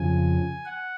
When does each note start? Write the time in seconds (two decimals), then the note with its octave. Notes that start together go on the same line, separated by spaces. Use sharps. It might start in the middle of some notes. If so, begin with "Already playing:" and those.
Already playing: F2 C#3 F3 G#5
0.65 F#5